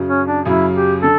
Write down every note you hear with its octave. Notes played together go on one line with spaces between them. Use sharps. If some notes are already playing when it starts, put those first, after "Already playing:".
Already playing: F#2 C#3 F#3
C#4
D4
F#2 C#3 F#3 E4
G4
D3 A4